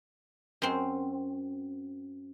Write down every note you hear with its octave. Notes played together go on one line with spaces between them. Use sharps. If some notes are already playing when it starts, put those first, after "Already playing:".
F#2 C4